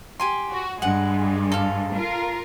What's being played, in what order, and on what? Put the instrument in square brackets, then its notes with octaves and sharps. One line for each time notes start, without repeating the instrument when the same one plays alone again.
[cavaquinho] G4 G#5 C6
[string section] F#4
[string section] G2 G#3 [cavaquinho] F#5
[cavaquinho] A4 F5
[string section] F4 A#4